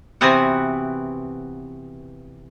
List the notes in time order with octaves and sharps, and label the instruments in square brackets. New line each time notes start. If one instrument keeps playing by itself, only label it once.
[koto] C3 E3 B3 C4 F#4 F#5